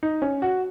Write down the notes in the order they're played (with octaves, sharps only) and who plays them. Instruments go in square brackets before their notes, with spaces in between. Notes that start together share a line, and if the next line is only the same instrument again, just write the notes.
[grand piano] D#4
C#4
F#4